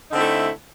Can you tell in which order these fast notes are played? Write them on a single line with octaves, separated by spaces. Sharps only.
D#4 D3 C4 E4 A3